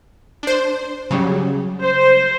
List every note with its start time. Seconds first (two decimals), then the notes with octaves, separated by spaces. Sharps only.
0.43 D4 C5
1.11 C#3 F#3 G3
1.80 C5